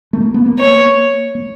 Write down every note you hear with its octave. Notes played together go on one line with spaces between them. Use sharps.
A3
A#3
B3
A#3
C#5
A#3